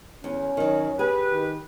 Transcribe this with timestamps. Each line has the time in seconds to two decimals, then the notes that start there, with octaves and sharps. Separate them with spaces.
0.24 E2 C#4
0.57 D#3 F#3
0.99 G4 G#4 B4
1.30 D#3